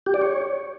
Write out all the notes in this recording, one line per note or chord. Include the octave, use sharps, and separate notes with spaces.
G4
D5
C#5